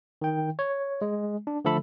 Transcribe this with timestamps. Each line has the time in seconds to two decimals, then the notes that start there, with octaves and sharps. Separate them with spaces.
0.22 D#3 G5
0.59 C#5
1.02 G#3
1.47 D4
1.65 D3 F3 A3 A4 B5